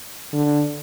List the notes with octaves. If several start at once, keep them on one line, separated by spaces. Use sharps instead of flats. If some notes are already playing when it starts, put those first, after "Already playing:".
D3